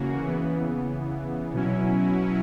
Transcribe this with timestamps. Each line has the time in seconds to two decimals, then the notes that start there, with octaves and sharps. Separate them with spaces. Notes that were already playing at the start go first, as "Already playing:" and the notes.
Already playing: C#3 E3 A#3 C#4 F#4
0.24 C#3 E3 B3
1.53 B2 F#3 C#4 E4